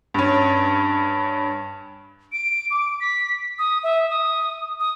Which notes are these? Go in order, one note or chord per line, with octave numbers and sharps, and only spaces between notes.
G2 C#4
D7
D6
B6
D#6
E5
D#6
D#6